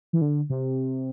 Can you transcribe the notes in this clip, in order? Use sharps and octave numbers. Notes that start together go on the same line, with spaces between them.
E3
D3
C3